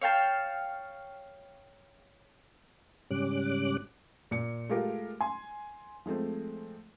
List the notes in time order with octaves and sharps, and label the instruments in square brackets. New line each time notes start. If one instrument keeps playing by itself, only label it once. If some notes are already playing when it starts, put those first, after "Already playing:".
[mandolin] C#5 F5 G5 A5
[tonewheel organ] G#2 C#3 G3 C#4 D6 F#6
[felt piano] A#2 C#7
G#3 A3 F4 G4 A#4
G#5 C6
F3 G#3 A3 C4